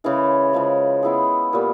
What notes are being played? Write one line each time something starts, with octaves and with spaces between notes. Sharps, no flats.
C#3 E3 G#3
C#3 F3 G#3
G#3 B3 E4 G#4
A#2 G3 B3